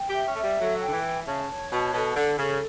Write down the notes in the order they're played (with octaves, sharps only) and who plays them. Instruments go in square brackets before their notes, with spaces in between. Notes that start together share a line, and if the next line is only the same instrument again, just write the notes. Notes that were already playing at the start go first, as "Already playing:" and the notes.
Already playing: [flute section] G5
[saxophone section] G4
[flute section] E5
[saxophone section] C#4
[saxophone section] A3 [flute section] E5
[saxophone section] G3
[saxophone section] F#3 [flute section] A4
[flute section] G5
[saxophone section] D3
E3
[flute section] E5
[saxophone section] C#3 [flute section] A5
[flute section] C#5
[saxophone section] B2 [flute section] A5
[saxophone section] B2 [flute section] A4
[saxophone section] D3 [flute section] A4
[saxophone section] C#3 [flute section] A4